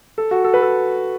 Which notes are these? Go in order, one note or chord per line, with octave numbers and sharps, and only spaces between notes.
A4
F#4
A4
B4
A4